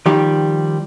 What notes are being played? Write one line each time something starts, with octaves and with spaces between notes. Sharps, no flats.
D#3 F3 G3 G4